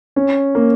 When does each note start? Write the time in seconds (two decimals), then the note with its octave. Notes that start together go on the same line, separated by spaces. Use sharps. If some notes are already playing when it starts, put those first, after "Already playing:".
0.16 C#4
0.55 A#3